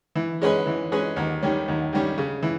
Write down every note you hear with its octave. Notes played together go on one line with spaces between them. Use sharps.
E3
G#3 C#4 G#4 B4
E3
G#3 C#4 G#4 B4
D#2
D#3 G3 C#4
D#2
D#3 G3 C#4
C#3
E3